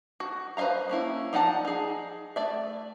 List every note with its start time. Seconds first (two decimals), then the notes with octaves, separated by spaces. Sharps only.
0.20 F#4
0.57 B4 C5 E5 F5 A#5
0.89 A#3 C#4 E4
1.33 F3 D#4 D5 F#5 A5
1.65 D#4 G#4
2.36 A3 D5 E5